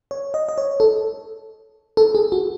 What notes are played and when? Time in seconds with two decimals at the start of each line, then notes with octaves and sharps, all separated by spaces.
0.11 C#5
0.34 D#5
0.49 D#5
0.58 C#5
0.80 A4
1.97 A4
2.15 G#4
2.32 F#4